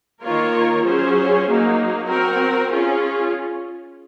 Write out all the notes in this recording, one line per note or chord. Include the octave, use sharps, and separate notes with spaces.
D#3 A#3 F4 A#4 C#5
F#3 C#4 F4 G#4 C5
F#3 A#3 D#4
C4 F#4 A#4
C#4 F4 G#4